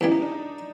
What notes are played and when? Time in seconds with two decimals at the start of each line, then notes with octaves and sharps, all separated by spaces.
0.01 E2 C#3 E3 G3 D#4
0.11 D#4
0.22 D4
0.32 D#4